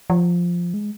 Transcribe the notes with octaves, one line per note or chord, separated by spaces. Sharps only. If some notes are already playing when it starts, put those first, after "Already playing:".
F3
G#3